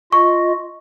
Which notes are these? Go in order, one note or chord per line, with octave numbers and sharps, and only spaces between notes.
F4 D#5 C#6